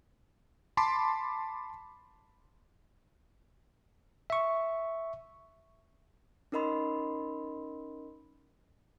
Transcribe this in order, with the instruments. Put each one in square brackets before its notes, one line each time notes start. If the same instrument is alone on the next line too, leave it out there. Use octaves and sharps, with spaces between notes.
[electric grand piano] A5 B5 C6 D6
[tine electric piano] E5 C#6
[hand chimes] C#4 D#4 A#4 D#5 B5 C6